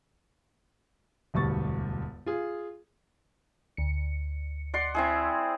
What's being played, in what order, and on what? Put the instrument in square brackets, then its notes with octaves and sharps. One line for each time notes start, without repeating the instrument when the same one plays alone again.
[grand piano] E1 D2 G2 C#6 A6
F4 G#4
[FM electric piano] D2 C#7
[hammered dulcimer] D5 F#5 C6
C4 E4 G#4